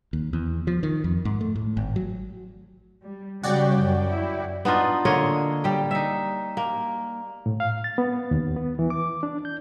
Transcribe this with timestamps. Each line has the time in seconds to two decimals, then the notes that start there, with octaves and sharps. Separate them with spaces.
0.13 D#2
0.33 E2
0.67 F3
0.83 D#3
1.04 F2
1.25 G#2
1.41 A3
1.56 A2
1.77 G#1
1.96 F#3
3.02 G3
3.43 C#3 G3 F#4 D5 G5
3.81 F#2
4.11 E4
4.65 B3 D4 D#4 F4
5.05 D3 A#3 C#5 D#5
5.64 G3 G4
5.91 D#4 E5
6.57 A#3
7.46 A2
7.60 F5
7.84 A6
7.98 B3
8.31 D#2
8.56 B3
8.79 E3
8.90 D6
9.23 D4
9.45 G6